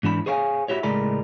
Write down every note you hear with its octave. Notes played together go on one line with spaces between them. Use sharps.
G#2 E3 D4 B5
G#4 C5 C#5 F5 G5 G#5
E4 F#4 G4 C#5
C#2 A2 G#3 A#4 D5 B5